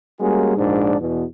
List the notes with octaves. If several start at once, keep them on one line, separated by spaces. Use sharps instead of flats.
G3 G#3 A#3 C#4 F#4 G#4
A#1 G#2 D4
E2 B2